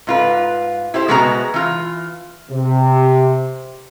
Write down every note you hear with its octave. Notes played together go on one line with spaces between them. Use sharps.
G#2 F4 B4
E4 G4 C5
B2 G#3 B3 F#4 A#4 A#5
E3 F4
C3